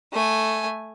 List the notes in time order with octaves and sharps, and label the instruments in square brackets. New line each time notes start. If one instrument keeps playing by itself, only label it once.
[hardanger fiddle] A3 G#5